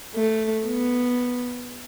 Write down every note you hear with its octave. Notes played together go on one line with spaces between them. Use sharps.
A3
B3